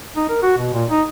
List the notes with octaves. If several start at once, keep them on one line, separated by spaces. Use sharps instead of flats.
D#4
A#4
F#4
B2
A#2
D#4